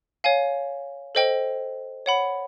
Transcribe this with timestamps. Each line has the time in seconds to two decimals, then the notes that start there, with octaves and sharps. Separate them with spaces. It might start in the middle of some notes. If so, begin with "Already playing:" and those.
0.24 C#5 F5 G#5
1.15 A4 C5 D#5 G5
2.06 C#5 F#5 B5